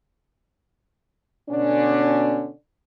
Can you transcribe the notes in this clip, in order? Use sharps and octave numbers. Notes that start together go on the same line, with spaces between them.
B2 D3 C#4 D4